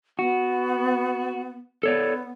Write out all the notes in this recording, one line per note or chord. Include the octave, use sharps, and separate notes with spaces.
B3 F#4
B3 A4 C#5 D5